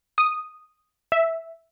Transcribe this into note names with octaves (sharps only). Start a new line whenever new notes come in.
D#6
E5